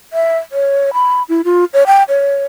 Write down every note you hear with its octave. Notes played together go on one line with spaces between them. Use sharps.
E5
C#5
B5
E4
F4
C#5
G5
C#5